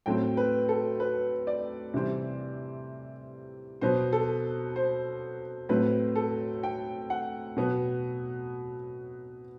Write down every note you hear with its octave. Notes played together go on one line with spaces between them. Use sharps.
A2 F#3 A3 C4 G5
B4
A4
B4
D5
C3 E3 G3 C4
B2 F#3 B3 C5
A4
C5
A2 F#3 A3 C4 B4
A4
G5
F#5
B2 F#3 B3